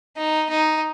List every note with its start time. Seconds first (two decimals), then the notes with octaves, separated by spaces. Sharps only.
0.16 D#4
0.49 D#4